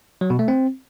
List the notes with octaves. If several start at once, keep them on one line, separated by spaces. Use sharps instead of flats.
F#3
B2
A3
C4